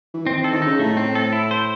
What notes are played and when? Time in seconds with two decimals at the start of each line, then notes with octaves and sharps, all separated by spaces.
0.14 E3
0.26 D#3 C4
0.39 E3
0.44 A4
0.53 D#3
0.62 C#3 D#4
0.79 A2 A3
0.97 C4
1.15 A4
1.33 E4
1.51 C5